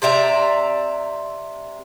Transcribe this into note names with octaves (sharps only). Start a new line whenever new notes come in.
C3 D5 E5 A#5